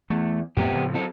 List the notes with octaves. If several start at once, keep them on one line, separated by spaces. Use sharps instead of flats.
E2 A3
F2 A2 F#3 B3 C4 G4
A2 C#3 F3
F#3 C4 A4